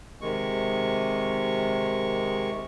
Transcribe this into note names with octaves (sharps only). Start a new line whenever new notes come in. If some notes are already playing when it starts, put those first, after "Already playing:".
C3 D#3 G#3 C#6